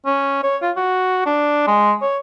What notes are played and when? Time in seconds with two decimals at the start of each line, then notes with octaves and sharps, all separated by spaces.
0.06 C#4
0.43 C#5
0.62 F4
0.77 F#4
1.26 D4
1.67 G#3
2.02 C#5